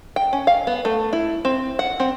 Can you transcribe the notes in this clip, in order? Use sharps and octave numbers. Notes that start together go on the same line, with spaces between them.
G5
C#4
F5
B3
A3
E4
C4
F#5
C4